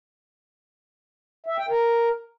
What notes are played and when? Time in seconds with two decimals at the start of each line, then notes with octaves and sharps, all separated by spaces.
1.46 E5
1.57 G5
1.69 A#4